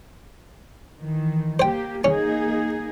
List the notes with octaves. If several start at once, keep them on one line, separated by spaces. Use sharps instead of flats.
D#3 E3
A#3 G4 C5 G5
A#3 C#4 D#4 G#4